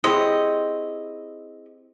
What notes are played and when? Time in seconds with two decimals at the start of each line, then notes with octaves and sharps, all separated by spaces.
0.04 C4 E4 G4 G#4 C#5 D#5